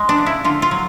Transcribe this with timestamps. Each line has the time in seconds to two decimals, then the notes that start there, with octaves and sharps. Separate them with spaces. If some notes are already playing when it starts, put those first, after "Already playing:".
Already playing: G#3 G#4
0.09 D4
0.18 C#3
0.26 E4
0.45 D3 F4
0.62 F4
0.71 F#3